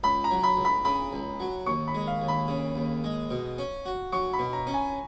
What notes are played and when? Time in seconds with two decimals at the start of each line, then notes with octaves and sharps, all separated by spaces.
0.03 C#2 B5
0.24 A#5
0.31 F#3
0.43 B5
0.57 C#2
0.65 B5
0.85 C#3 B5
1.13 C#2
1.40 F#3
1.66 D#2 C#6
1.88 B5
1.94 G#3
2.08 F5
2.22 D#2
2.28 B5
2.48 C#3
2.76 D#2
3.04 G#3
3.31 B2
3.58 C#4
3.86 F#4
4.13 F#3 C#6
4.33 B5
4.39 B2
4.53 A#5
4.67 C#4
4.74 G#5